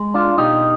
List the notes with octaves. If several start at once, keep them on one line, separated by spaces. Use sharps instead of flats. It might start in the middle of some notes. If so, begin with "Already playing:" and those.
Already playing: G#3
D4 F4
B2 D#4 G4